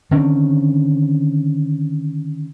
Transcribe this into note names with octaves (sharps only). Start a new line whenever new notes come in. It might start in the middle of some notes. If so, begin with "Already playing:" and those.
D3 D#3 C4 C#4